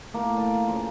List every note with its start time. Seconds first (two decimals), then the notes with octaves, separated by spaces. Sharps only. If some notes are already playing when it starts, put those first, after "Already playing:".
0.14 A3 A#3 E4
0.37 D5 F5
0.68 C#3 F3